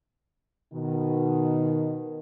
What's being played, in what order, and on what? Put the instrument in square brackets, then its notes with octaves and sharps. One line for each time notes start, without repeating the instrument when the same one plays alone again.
[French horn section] B2 D#3